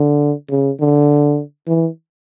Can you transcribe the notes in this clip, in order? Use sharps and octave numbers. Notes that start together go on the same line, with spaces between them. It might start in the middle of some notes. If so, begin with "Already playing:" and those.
Already playing: D3
C#3
D3
E3